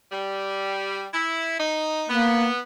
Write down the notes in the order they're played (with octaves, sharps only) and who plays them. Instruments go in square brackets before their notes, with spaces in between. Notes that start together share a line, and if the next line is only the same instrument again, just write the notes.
[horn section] G3
E4
D#4
[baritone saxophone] A#3 [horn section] B3